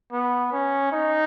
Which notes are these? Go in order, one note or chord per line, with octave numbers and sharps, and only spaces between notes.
B3
C#4
D#4